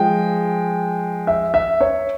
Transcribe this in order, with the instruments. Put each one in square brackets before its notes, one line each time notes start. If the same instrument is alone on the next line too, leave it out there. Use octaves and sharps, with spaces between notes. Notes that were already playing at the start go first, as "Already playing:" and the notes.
Already playing: [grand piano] F3 G#3 G5
E5
E5
C#5